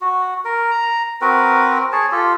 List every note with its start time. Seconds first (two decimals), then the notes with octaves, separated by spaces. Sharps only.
0.01 F#4
0.45 A#4
0.71 A#5
1.21 C4 F#4 A#4 B4
1.92 G#4 C#5 A5
2.12 F4 G4 A4